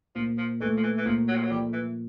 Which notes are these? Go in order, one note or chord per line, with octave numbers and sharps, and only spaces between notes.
A#2 F3
F3
E3 A3
F3
E3
E3
A#2 F3
F#3
F3
F#3
F3 G3
E3